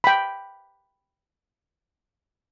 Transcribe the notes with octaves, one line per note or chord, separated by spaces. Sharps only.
G5 B5